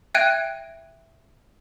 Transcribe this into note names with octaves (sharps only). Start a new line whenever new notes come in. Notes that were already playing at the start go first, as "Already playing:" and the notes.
E5 G5 F#6 G#6 D7 D#7